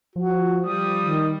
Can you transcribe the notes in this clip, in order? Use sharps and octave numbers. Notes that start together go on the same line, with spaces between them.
F3 F#4
G3 D#6
D#3